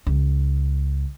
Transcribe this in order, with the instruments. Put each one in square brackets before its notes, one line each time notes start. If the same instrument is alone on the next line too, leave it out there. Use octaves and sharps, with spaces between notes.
[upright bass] C#2